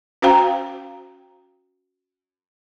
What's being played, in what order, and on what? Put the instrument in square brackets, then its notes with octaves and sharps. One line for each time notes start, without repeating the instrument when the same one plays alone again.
[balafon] C#4 F#4 C5 F5 G5 A#5